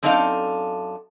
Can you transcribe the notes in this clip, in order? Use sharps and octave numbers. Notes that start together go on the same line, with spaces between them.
F#2 C4 D4 D#4 A4 F5